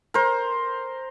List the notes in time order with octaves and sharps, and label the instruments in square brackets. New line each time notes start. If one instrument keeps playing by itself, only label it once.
[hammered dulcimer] A#4 C5